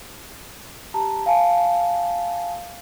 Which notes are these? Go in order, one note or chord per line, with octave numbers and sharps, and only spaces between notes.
G4 A5 A#5
F5 G#5 A5